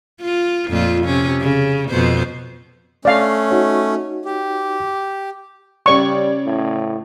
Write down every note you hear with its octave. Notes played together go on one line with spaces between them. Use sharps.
F4
F2 A#2 F4
C3 C#4
C#3
F2 B2 C5
A3 C#4 D5 F5
D#4 F#4 C#5
G4
C#3 G3 C#5 D5 C#6
A2